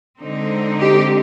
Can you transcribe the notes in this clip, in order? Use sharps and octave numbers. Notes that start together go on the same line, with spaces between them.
D3 G#3 C4 D#4
G4